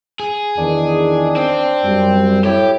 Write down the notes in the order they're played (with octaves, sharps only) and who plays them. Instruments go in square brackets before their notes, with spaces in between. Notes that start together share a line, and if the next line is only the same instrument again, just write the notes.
[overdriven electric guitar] G#4
[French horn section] E2 D#3 [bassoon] D4
[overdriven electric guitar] C4
[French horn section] F#2 G3
[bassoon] A2 [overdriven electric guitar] G4